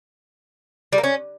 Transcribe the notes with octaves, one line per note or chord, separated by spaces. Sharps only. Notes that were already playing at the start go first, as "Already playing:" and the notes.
G3
A#3
C#4